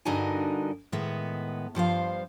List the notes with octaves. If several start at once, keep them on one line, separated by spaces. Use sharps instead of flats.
G2 D3 D#4 F#4 A#4 G#5
A2 D#3 G#3 B3 E5
G2 F3 C5 F5